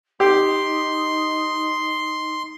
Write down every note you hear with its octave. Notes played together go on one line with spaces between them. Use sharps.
D#4 G4 C6